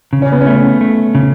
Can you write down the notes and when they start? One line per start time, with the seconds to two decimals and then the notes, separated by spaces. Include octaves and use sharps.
0.13 C#3
0.22 C#4
0.32 B3
0.41 C#4
0.47 A3
0.81 A3
1.15 C#3